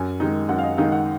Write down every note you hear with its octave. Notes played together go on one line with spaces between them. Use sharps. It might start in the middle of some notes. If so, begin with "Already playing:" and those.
Already playing: F#2 G#5
D#3 G#3 D#4
F#2 F#5
F5
D#5
D#3 G#3 D#4 F5
F#5